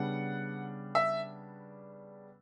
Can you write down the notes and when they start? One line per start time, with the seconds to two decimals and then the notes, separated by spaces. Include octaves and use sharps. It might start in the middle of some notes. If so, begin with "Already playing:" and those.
Already playing: C#3 G3 B3 D4 F#5
0.95 E5